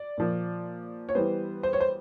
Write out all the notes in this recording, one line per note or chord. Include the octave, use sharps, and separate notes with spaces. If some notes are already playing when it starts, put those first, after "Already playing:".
Already playing: D5
A#2 F3 A#3
C#5
E3 G3 B3 C5
C5
C#5
C5